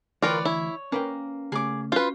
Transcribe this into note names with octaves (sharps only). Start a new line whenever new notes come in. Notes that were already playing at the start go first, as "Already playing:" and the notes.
D2 E3 F4 A#4 B4 C#5 D5 G5
E4 C#5
A#3 C#4 B4 G5
C#3 A3 C#4 G#4 D6
C#4 F4 F#4 B4 C5 F5